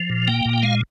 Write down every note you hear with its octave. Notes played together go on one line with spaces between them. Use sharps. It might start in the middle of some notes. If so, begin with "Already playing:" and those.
Already playing: F3
A#2
A#3 G5
A#2
G5
G#3 F5